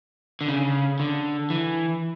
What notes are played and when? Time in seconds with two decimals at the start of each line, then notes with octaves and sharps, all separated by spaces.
0.41 D3
0.48 C#3
1.00 D3
1.50 E3